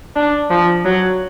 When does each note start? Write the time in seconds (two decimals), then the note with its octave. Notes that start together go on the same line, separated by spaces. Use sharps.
0.16 D4
0.50 F3
0.85 F#3